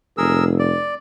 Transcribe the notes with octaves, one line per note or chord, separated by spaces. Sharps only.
F1 G#4 A#4 E6
D5